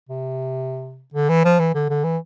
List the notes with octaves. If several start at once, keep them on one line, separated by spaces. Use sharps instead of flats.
C3
D3
E3
F3
E3
D3
D3
E3